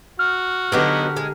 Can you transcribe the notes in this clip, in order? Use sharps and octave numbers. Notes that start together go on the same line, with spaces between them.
F#4 F6
D3 F#3 B3 D#4 G4 A#4
G#3